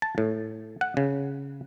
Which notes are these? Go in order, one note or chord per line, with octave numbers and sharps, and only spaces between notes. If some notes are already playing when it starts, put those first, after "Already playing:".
A5
A2
F#5
C#3